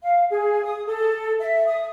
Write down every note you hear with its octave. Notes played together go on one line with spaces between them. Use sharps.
F5
G#4
D#6
A4
E5
D#6